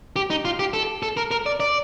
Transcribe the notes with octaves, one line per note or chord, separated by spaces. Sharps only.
G4
D#4
F4
G4
A4
A4
A#4
A#4
D5
D5